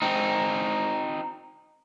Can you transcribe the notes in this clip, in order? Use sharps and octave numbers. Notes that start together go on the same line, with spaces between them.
C4 D#4